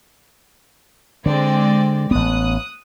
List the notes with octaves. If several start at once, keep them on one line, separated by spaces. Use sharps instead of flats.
D3 G#3 C4 D5
A1 B3 D#6 F#6